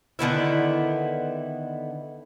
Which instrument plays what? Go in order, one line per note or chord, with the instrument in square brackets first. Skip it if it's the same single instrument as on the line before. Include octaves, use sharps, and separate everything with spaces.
[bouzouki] D3 D#3 B3 E4